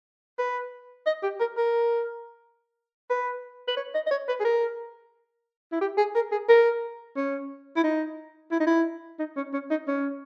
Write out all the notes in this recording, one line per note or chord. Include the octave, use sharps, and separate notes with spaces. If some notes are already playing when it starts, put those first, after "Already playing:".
B4
D#5
G4
A#4
A#4
B4
B4
C#5
D#5
D#5
C#5
B4
G#4
A#4
E4
G4
G#4
A#4
G#4
A#4
C#4
E4
D#4
E4
D#4
E4
D#4
C#4
C#4
D#4
C#4